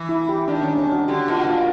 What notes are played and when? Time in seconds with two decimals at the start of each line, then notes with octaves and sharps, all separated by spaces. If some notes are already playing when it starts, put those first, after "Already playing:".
Already playing: E3
0.09 E4
0.29 G4
0.48 D#3 D4
0.63 C#4
0.73 D4
0.78 C#4
0.93 F#4
1.08 D3 G4
1.28 B2 F4
1.37 F#4
1.47 A#2